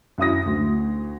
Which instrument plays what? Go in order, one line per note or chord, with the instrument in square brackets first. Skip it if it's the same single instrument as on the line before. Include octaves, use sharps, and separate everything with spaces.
[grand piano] F#2 E4 D#6 A#6
D2